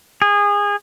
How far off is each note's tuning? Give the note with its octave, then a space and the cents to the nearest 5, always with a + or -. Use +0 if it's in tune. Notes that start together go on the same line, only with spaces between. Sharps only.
G#4 -25